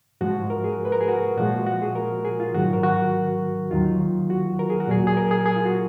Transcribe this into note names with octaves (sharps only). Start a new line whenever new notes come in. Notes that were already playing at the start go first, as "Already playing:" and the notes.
G#2 F3 G#3 F#4
A#4
G#4
B4
A#4
G#4
F#4
A#2 F3 G#3 F#4
F#4
G#4
A#4
G#4
F4
G#2 D#3 F#3 F#4
A#4
F#4
D#2 D#3 F#3 F4
F#4
A#4
G#4
F#4
A#2 F#3 G#4
G#4
A#4
G#4
G#4
F4
F#4